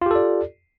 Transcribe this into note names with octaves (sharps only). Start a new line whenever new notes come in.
F4 G4 A4 D5